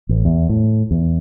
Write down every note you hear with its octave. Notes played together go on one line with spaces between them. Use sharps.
A1
E2
A2
E2